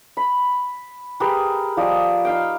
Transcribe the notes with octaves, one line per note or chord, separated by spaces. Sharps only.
B5
G4 G#4 A#4 B4
F3 G4 D5 D#5
D#4 F5 G5